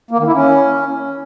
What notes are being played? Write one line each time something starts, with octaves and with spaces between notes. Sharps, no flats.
A#3
D#3
E4
C#4